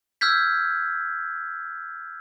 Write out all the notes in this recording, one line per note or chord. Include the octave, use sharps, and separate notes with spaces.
E6 F6 G6 G#6 B6